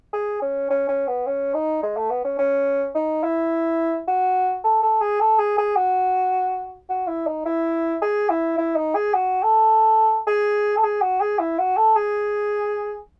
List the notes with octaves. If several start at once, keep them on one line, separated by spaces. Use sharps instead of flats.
G#4
C#4
C#4
C#4
B3
C#4
D#4
G#3
A3
B3
C#4
C#4
D#4
E4
F#4
A4
A4
G#4
A4
G#4
G#4
F#4
F#4
E4
D#4
E4
G#4
E4
E4
D#4
G#4
F#4
A4
G#4
A4
G#4
F#4
G#4
E4
F#4
A4
G#4